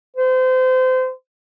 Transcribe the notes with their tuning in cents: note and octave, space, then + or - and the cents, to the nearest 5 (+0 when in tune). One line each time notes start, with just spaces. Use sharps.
C5 -30